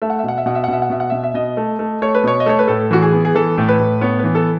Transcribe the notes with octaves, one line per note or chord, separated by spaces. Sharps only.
A3 E5
F#5
E5
B2 F#5
E5
B2 F#5
E5
F#5
B2 E5
F#5
B2 E5
F#5
B2 E5
E5
B2 D#5
A3
A3
A3 C#5
B4
B2 C#5
D#5
A3 C#5
B4
A2 A4
E3 F#4
G#4
B3
G#4
E3 A4
A2
B4
A2
B3 C#5
E3 B4
A4